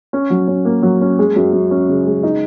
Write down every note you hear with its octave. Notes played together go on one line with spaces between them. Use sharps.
C#4
F#3
C#4
A#3
F#3
C#4
G#3
F#2
F#2
C#4
C#3
G#3
D#4